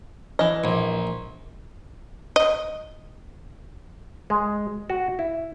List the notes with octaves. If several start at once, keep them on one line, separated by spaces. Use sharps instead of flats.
E3 D#5
A#1
D#5
G#3
F#4
E4